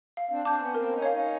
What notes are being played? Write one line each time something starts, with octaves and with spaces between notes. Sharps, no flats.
F5
C4 D4
C4 D4 A5 D6 G6
B3 C#4
A#3 C4 A#4
C#4 D#4
C#5 F5
C#4 D#4